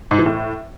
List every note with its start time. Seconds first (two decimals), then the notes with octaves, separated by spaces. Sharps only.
0.11 G#2
0.18 E3
0.26 A2